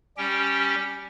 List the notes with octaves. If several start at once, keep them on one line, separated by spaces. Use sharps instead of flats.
G3 C#4 G4 G5